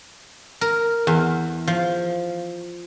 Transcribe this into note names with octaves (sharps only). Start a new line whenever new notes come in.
A#4
E2
F3